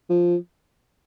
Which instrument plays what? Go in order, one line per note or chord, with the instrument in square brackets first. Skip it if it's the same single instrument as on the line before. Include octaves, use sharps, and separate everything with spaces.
[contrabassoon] F3